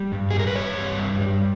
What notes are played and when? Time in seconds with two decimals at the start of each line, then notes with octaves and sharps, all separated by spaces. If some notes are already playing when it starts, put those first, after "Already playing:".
Already playing: G3
0.12 G2
0.30 G#4
0.34 G3
0.39 A#4
0.47 B4
0.56 G2 C#5
0.78 G3
1.00 G2
1.21 G3